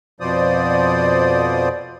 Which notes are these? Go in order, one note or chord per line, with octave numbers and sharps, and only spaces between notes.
F2 B2 F3 C5 D5 D#6